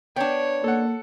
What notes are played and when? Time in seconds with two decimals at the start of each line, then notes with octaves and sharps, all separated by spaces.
0.16 B3 D4 C#5 G5
0.64 A#3 A4 F#5